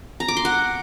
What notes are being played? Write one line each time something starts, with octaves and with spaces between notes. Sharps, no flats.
A#5
D6
C6
F#5